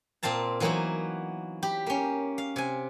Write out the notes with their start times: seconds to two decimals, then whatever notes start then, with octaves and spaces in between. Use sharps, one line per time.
0.23 A#2 C4 F5 A5 A#5
0.60 E3 F#3 A#3 B3 D#4 F#4
1.63 G4 B5
1.86 A#3 C#4
2.38 F5
2.56 C3 G#5